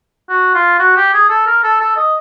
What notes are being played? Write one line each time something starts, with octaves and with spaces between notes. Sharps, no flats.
F#4
F4
F#4
G4
G#4
A4
A#4
A4
A4
D#5